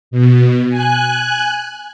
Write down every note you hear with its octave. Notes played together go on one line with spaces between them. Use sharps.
B2
G#5 F#6